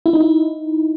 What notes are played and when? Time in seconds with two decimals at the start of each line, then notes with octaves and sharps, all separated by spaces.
0.06 E4
0.13 D#4
0.20 E4